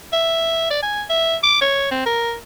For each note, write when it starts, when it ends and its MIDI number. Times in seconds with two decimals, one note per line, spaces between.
0.13 0.66 76
0.71 0.80 74
0.83 1.04 80
1.10 1.36 76
1.44 1.57 86
1.61 1.90 73
1.91 2.03 60
2.06 2.35 70